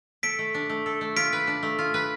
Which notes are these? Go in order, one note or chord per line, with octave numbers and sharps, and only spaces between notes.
A4 B6 D7
A3
D4
A3
A4
A3
F4 B6 D7
B4
D4
A3
F4
B4